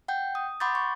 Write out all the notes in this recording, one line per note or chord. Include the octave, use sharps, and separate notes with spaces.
F#5 G5 G6
D#6
F#5 B5 C6 D6 G6 A6
C#6